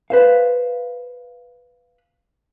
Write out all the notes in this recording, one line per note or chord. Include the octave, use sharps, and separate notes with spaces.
B4 C5 F5